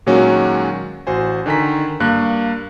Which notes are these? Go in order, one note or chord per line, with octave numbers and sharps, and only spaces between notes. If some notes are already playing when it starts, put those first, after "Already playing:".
A#2 D#3 F#3 G#3 C#4 F#4
A1 F#4 C5 G#5
D3 D#3 G#5 A#5 B6
G2 A#3 F5 F#6